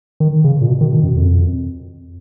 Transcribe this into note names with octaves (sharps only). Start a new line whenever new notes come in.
D#3
C#3
A#2
B2
D#3
B2
F#2
F2